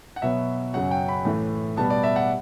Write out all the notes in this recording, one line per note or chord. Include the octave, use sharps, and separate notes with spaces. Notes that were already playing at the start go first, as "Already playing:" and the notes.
F#5
B2 F#3 B3 E5
F#2 C#3 F#3 F#5
G5
B5
A2 E3 A3
B2 G3 B3 A5
D5
E5
F#5